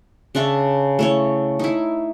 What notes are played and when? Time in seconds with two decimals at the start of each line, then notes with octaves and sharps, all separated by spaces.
0.35 C#3 D4 E5 C#6
0.99 A3 E4 C#5
1.59 D#4 E4